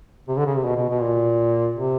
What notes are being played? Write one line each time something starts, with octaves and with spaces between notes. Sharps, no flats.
C3
D3
C#3
C3
B2
B2
B2
A#2
C3